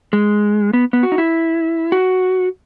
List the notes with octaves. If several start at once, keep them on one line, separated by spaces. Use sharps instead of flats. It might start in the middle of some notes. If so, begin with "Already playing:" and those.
G#3
B3
B3
F#4
D#4
E4
F#4